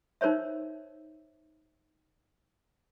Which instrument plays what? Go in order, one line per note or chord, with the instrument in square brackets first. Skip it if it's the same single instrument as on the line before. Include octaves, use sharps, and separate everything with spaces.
[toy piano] D#4 A#4 C5 C#5 E5